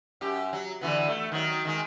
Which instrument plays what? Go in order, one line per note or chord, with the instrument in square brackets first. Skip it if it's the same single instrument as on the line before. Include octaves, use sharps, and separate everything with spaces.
[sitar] F#2 G4
F#3
D3 E3 B3
A3
D#3 F#3
D#3 G#3